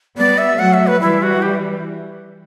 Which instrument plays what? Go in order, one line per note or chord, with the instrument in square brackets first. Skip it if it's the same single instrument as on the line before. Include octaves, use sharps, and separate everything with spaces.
[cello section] G3 B3 [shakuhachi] D5
[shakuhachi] E5
[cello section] F#3 A3 [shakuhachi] F#5
[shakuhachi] E5
B4
[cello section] E3 G3 [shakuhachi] E4
[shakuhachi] F#4
G4